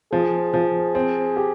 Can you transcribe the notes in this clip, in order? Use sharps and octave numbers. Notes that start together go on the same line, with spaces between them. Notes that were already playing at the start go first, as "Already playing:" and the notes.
F3 G#4
F3
C4
G4